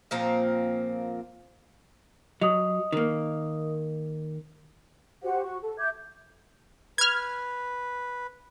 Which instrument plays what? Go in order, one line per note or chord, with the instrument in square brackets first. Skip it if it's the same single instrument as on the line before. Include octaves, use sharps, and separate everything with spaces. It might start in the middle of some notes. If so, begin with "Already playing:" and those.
[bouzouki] A#2 F3 A#3 C4
[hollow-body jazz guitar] F#3 [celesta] D#5 D#6
[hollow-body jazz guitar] D#3 A#3
[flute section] F#4 G4 C5 F#5
F#4 C#6
A4
E5 D6 G6 G#6
[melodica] B4 [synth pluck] F6 G#6